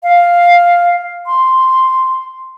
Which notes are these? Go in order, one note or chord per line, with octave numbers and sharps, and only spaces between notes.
F5
C6